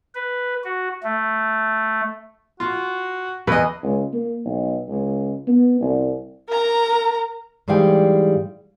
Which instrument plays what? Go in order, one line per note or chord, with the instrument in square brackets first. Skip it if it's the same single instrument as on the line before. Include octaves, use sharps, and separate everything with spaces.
[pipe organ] B4
F#4
A3
[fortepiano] F4 [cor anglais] F#4
[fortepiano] E2 D#5 [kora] B4
[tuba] C#2
A#3
B1
C#2
B3
C2
[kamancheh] A#4 A#5
[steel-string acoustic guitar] G#2 E3 G3 G#4 F5 G5